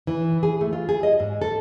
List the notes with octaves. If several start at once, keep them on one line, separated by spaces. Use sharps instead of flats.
E3
G#4
A3
F4
G#4
D#5
G#2
A4